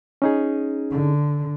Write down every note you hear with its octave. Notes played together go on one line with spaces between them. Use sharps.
C#4 D#4 G#4
D3